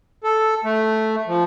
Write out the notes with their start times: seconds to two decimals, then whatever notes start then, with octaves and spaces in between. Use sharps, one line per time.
0.24 A4
0.64 A3
1.27 F3